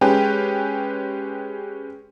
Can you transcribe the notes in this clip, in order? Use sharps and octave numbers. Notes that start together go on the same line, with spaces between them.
G#3 C#4 G4 B4